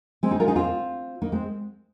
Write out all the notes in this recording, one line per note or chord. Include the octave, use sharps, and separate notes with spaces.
G#3 C4
D#4 G#4
F4 A#4
D#4 G#4
C4 F4
A#3 D#4
G#3 C4